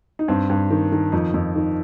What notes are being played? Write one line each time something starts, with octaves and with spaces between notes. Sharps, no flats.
D#4
G2 C4
G2
D#3
D#3
F2 D#4
F2
D#3